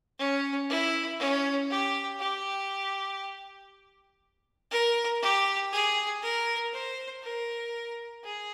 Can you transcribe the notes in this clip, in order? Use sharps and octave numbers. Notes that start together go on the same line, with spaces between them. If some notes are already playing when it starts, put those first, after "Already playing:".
C#4
E4
C#4
G4
G4
A#4
G4
G#4
A#4
C5
A#4
G#4